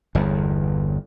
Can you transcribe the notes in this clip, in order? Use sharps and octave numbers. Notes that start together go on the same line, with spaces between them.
G1 E2